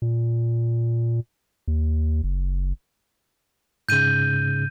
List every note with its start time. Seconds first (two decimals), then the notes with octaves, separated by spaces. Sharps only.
0.02 A#2
1.68 D#2
2.24 F#1
3.89 G#2 C#3 G6 D#7